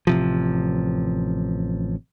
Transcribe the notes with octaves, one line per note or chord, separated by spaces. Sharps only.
A1 C3 F3